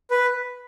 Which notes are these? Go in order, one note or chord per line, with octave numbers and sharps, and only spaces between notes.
B4